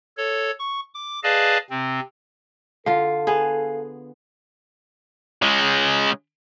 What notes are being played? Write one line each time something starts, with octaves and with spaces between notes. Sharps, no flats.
A4 C#5
C#6
D6
G#4 B4 D5 D#5 F5 A5
C3 C4
D3 F4 A4 F5
B3 G#4
C#3 G#3